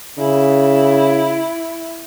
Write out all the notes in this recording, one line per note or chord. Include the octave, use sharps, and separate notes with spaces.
C#3 E4